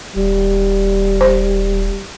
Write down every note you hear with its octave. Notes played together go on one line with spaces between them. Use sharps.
D#1 G3
C5